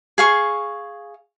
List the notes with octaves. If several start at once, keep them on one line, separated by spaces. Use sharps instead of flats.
G#4 F5 C#6